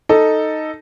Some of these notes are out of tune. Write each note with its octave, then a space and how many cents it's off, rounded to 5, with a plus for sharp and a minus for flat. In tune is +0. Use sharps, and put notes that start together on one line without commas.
D#4 +0 A4 +5